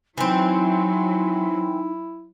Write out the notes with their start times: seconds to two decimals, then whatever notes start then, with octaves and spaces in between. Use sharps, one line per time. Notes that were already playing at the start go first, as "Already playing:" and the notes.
0.18 E3 F#3 C4 D#4 E4